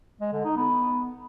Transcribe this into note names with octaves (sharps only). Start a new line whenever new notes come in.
G#3
D3
D#4
B3